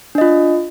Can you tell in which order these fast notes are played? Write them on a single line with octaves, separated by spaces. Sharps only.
D4 D#5 F4